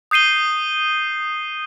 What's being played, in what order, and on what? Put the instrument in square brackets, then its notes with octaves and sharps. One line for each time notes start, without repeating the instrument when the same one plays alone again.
[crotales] D#6 G6 C7 D#7 G7